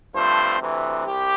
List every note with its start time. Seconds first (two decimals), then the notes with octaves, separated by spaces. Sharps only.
0.14 G2 F3 A3 C4 C5
0.60 D2 C3 E3
1.05 C2 G4